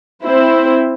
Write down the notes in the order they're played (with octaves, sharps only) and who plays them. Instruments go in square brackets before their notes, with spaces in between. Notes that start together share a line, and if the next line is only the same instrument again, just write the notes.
[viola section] C4 E4 C5